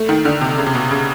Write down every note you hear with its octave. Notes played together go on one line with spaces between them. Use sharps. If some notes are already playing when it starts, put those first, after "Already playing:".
Already playing: A3
D#3
D3
C3
C#3
C3
B2
C#3